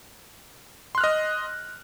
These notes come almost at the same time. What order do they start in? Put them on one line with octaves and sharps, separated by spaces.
C6 F#6 F6 D#5